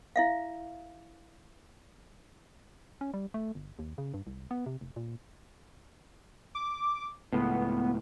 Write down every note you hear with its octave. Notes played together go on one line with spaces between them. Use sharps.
E4 E5 F5
C#4
G3
A3
G1
D#2
C#3
G2
C2
B3
C3
F1
A#2
D6
C#2 A2 B3